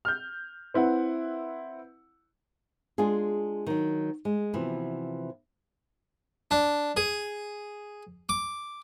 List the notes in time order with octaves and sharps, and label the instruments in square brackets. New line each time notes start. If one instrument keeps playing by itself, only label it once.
[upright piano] F6 G6
C4 E4 B4 F#5
[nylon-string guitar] G#3 D4 F4 G#4
D#3 F#3
G#3
C3 E3 F3 B3 E4 F#4
[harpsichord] D4
G#4
D6